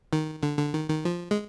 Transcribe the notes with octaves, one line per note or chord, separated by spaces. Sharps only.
D#3
D3
D3
D#3
D#3
F3
G#3